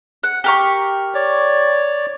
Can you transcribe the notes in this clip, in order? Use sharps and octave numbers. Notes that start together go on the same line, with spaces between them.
F#5
G4 A#4 C#6
C#5 D5